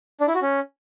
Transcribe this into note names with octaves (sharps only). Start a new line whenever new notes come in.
D4
E4
F#4
C#4